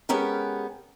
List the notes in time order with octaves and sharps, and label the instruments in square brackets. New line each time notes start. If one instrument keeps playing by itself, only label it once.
[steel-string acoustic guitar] G#3 B3 C#4 G4 A#4